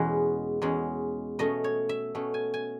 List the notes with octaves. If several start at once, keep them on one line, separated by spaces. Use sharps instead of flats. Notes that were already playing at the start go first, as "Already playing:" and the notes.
Already playing: E2 B2 G#3 C#4 B4
E2 B2 G#3 C#4
B2 A3 C#4 D#5
C#5
E5
B2 A3 C#4
G#5
G#5